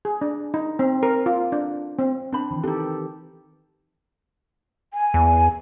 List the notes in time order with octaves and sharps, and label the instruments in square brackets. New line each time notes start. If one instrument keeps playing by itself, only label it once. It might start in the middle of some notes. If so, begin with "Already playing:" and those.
[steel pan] G#4
D4
D#4
C4
A#4
F4
D4
C4
[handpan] C4 [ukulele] D4 C5 B5
[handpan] D#3 E3
[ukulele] D4 D#4 [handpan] G4 A4
[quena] G#5
[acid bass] E2